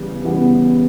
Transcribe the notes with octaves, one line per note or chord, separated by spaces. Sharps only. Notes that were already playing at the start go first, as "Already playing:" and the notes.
Already playing: C#3 E3 G3 B3
E2 C#3 E3 G3 B3